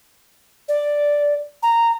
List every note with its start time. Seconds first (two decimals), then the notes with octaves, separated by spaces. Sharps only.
0.68 D5
1.63 A#5